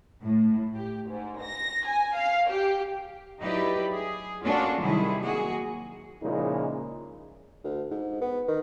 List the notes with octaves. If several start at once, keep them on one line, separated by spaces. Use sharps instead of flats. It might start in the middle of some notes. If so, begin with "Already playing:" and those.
A2
G4
G#2
A#6
G#5
F5
G4
F#3 D#4 E4 G4 B4 D5
G#4
A#3 C#4 D4 F4 F#4 A4
C3 D#3 F#3 G3 E4 G#4
A#3 F#4 G#4
A#2 C#3 F3 G#3 D#4 E4
D2
G#2
B3
D#3